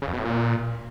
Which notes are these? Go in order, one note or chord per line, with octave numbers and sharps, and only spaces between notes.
C#3
F2
B2
A2
A#2